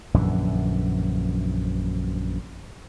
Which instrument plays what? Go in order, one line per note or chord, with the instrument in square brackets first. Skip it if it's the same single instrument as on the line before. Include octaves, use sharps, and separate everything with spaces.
[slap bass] A#1 F#2 D3 E3